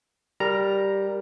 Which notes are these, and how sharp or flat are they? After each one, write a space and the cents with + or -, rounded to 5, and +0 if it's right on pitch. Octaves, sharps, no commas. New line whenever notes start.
G3 +0 A#4 +5 A#5 +0